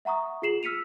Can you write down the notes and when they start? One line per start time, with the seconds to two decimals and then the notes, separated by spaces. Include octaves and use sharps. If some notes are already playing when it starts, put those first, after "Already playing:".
0.05 E5 F#5 A#5 C#6 D#6
0.42 F4 G#4 C7 E7 F#7
0.63 E6 F6 B6 C#7 D#7 F7